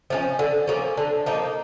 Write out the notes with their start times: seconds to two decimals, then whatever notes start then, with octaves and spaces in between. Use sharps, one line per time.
0.10 F3 A#3 C#4
0.39 D3
0.68 F3 A#3 C#4
0.97 D3
1.26 F3 A#3 D#4